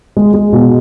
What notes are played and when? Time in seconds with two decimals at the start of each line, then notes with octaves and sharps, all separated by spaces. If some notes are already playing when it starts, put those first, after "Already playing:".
0.17 G#3
0.34 G#3
0.52 B2